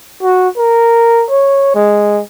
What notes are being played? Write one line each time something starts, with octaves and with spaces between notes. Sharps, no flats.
F#4
A#4
C#5
G#3